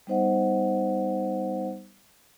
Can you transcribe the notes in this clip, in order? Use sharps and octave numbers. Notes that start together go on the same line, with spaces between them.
G3 B3 D#4 C5 D#5 F#5